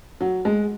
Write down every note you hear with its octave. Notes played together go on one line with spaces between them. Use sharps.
F#3
G#3